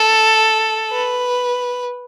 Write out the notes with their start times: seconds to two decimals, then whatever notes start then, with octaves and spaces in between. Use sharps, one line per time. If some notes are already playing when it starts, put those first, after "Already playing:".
Already playing: A4
0.92 B4